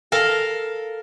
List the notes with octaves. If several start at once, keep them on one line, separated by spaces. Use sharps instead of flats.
A4 A#4 F5